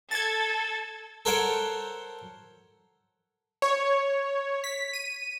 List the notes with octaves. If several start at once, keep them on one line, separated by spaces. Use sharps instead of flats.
A4 G#6 A6
A4 A#4 C5 C#5 F#5 G5
C#5
B6
D#7